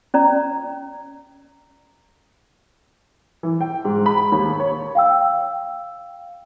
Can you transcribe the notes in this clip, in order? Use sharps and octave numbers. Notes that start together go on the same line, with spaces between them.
C#4 D5 A#5
E3
G5
G#2
B5
D#2
C#5
F5 G5 E6